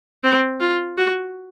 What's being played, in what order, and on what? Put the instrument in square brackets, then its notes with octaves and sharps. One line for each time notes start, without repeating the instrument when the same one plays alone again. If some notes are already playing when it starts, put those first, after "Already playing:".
[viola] C4
F4
F#4